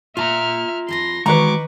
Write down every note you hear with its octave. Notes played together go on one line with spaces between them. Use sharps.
A#2 F4 E5 A5 A#5 F6
F2 G#4 B4 C6 A#6
D#3 E3 G#3 F#4 B4 A#5 C#6 D6